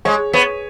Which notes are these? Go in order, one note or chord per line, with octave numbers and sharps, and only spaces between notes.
G#3 C#5
B3 C#5